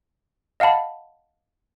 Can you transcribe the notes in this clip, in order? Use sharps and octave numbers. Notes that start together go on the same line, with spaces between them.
D#5 F5 F#5 A5 B5